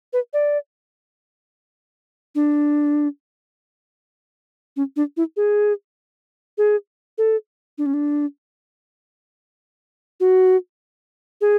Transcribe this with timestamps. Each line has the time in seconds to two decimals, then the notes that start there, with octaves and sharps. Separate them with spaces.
0.13 B4
0.33 D5
2.35 D4
4.76 C#4
4.96 D4
5.17 E4
5.37 G#4
6.58 G#4
7.18 A4
7.78 D4
7.86 C#4
7.94 D4
10.20 F#4
11.41 G#4